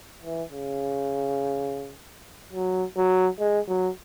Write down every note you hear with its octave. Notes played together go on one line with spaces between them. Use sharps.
E3
C#3
F#3
F#3
G#3
F#3